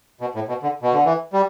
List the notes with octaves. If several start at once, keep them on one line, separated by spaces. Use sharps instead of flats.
B2
A2
B2
D3
B2
D3
E3
G3